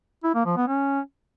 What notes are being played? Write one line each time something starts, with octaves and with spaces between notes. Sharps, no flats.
E4
A#3
F3
B3
C#4